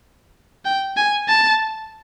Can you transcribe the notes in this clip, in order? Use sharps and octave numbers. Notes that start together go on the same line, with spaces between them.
G5
G#5
A5